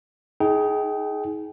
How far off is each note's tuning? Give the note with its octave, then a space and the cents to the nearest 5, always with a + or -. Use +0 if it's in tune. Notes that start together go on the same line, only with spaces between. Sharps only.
D#4 +30 G#4 +15 G5 -25